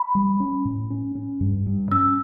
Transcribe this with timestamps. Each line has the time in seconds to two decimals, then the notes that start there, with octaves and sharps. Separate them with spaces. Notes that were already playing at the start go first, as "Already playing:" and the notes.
Already playing: B5
0.15 G3
0.40 C#4
0.65 A2
0.90 C#4
1.15 C#4
1.41 G2
1.66 G2
1.91 C#4 E6